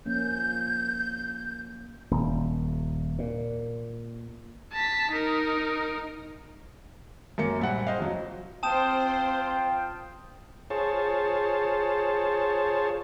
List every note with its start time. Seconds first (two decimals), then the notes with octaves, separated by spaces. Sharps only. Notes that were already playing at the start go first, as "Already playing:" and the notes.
0.06 F3 A#3 C#4 G6
2.11 D#1
3.19 A#2
4.73 A5 B6
5.11 D#4 A#4
7.38 F#2 A#3 C#7
7.59 A#1 G3 F#5
7.87 C5 D#5 F5
8.00 F2 F#3
8.63 C4 F4 C5 G5 A5 D#6 E7
10.70 F4 G#4 C5 C#5 A5